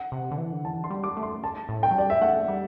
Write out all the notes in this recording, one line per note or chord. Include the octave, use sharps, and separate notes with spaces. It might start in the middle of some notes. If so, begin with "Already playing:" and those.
Already playing: F#5
C3
D3
E3
D3
E3 A5
C6
G3
D6
A3
C6
A5
A2
G5
F#3
G3 D5
E5
A3 F#5
G3